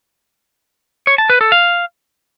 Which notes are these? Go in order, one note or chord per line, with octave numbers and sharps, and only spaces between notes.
C#5
A5
B4
A4
F5